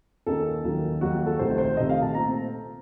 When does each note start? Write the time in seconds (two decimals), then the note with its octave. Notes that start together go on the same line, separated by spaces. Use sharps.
0.26 D#2 D#3 A#3 C#4 A4
0.64 D#2 D#3 F#3
1.01 D#2 D#3 F#3 F#4
1.14 F#4
1.26 A4
1.39 C2 C3 D#3 A3 C5
1.58 C5
1.76 C2 C3 D#3 A3 D#5
1.89 F5
2.02 A5
2.14 A#2 A3 C4 A#5